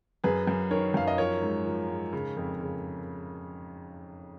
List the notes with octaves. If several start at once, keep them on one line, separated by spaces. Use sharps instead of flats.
F#2 G#4 B4
F#2
D#3 A#4 C#5
F#2 F5
D#5
F3 A#4 C#5
G#2
F3
G#2
C#3
F2
C#3